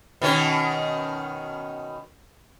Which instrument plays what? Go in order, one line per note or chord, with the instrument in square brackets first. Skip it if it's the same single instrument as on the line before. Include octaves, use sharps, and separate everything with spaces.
[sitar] B2 D#3 C#4